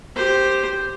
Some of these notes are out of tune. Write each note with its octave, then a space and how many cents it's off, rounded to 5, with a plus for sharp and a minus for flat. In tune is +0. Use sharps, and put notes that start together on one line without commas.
G4 +0 C5 +0